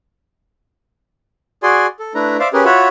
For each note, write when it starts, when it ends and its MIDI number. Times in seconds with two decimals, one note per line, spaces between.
1.63 1.86 66
1.63 1.86 68
1.63 1.86 74
1.63 1.86 80
1.63 1.86 84
1.99 2.13 69
2.15 2.37 57
2.15 2.37 62
2.15 2.37 64
2.15 2.37 71
2.15 2.37 82
2.40 2.48 72
2.40 2.48 74
2.40 2.48 76
2.40 2.48 77
2.53 2.64 61
2.53 2.64 67
2.53 2.64 68
2.53 2.64 70
2.53 2.64 71
2.65 2.88 65
2.65 2.88 66
2.65 2.88 73
2.65 2.88 76
2.65 2.88 78
2.65 2.88 83